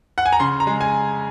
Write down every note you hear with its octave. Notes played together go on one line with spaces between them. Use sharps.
F#5
G#5
A#5
C#3 C6
A#5
G#3
G#5